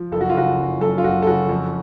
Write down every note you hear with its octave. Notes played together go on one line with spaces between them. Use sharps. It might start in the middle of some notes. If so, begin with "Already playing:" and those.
Already playing: F3
F#1 A4
F#4
F4
C#3 F#4
F#1
F#2 A4
F4
F#1 F#4
A4
C#3 F#4
F2